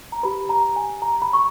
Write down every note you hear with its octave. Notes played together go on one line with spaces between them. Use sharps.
A#5
G4 B4 B5
A#5
G#5
A#5
B5
C#6